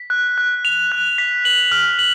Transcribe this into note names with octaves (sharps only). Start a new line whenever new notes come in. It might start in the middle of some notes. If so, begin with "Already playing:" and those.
Already playing: B6
F#6
F#6
F7
F#6
B6
F#7
F6
F#7